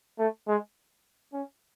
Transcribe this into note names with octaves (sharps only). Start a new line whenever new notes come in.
A3
G#3
C#4